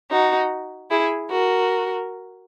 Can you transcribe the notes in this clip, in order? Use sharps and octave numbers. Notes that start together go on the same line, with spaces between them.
D#4 F#4
E4 G#4
F#4 A#4